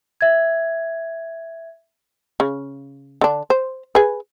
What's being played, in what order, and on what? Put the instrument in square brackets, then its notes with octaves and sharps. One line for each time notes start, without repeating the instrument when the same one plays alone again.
[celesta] E5 G#6
[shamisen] C#3
D3 D4
C5
G#4 B4